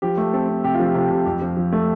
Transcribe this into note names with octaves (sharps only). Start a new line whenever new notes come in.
F3 G4
A3
C4 A4
C4
C3 G4
F4
F3
G4
C3 F4
C3
F2 G4
F3
F3
A3